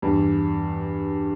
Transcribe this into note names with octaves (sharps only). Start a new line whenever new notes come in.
E2 G2